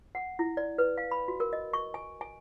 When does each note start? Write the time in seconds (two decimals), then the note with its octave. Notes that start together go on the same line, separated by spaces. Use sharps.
0.15 F#5
0.39 E4
0.57 D5
0.78 B4
0.98 F5
1.11 B5
1.28 F#4
1.40 A#4
1.53 D#5
1.73 C#6
1.94 G#5
2.21 G#5